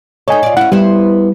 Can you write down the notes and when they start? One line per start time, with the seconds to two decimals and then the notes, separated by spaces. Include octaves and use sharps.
0.28 D#4 A4 C#5 D#5 G#5
0.43 F4 D5
0.57 C#4 E4 F#5
0.72 G3 B3 E4 C5